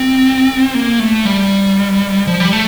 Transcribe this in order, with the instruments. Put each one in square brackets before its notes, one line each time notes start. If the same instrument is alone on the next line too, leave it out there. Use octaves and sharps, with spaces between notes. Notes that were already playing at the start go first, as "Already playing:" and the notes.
Already playing: [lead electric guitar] C4
A#3
A3
G3
F3
G3
A3